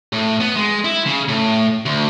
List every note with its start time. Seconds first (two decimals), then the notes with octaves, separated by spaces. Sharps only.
0.13 A2
0.40 B3
0.56 G#3
0.85 E4
1.06 C#3
1.29 A2
1.86 D2